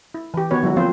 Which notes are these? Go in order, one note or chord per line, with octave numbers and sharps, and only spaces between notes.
E4
E3 G4
D#3 B3 F#4 B4 C#5
D3 F#3 G#3 E4 F#4
F3 A#3 C4 F4 C5